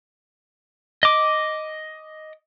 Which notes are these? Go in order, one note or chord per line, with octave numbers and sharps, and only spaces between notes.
D#5 D6